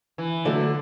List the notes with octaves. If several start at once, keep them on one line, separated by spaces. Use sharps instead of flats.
E3
D3 F#3 A3